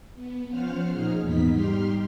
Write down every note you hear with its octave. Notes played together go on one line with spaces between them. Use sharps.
B3
F3 C#4 F4 C5 F#5 F6
A#2 D#4 G#4 F6
E2 G#2 B3 D#4 B6
G3 D#4 G4 C6 F6